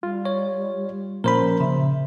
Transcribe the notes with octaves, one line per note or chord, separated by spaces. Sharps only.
G3 F4
C#5
A#2 F3 C#4 A#4 C5 B5
C#3 E5